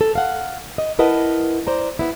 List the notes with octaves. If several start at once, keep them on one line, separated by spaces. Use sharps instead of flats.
A4
F5 F#5
D#5
E4 A#4 B4 D#5 F#5 A5
C5 D5 A#5
B3 E4